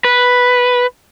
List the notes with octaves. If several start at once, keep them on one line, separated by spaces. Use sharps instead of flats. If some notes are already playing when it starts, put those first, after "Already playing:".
B4